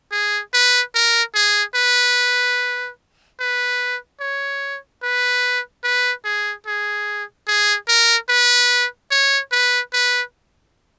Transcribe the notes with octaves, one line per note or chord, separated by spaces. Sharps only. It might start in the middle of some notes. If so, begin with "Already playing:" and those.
G#4
B4
A#4
G#4
B4
B4
C#5
B4
B4
G#4
G#4
G#4
A#4
B4
C#5
B4
B4